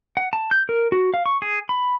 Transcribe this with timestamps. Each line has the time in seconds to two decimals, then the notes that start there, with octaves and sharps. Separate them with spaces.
0.17 F#5
0.33 A5
0.51 G6
0.69 A#4
0.92 F#4
1.14 F5
1.26 C#6
1.42 G#4
1.69 B5